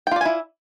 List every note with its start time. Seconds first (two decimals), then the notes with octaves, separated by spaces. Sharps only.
0.07 G5
0.11 F4
0.16 D5
0.21 G#5
0.25 E4